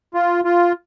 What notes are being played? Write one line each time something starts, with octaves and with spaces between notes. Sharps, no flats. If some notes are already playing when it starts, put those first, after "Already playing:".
F4
F4